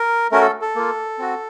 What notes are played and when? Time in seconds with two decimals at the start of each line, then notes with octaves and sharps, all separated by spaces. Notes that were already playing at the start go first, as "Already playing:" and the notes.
Already playing: A#4
0.32 A3 C#4 F#4 A#4
0.41 A4
0.61 A4
0.75 A#3 F4
1.19 C4 F#4